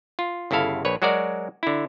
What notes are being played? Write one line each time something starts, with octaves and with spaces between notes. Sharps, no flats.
F4
G1 C#3 E4 A4 F5
A#1 B4 C#5
F#3 G#3 F#4 A#4 D5
D3 E4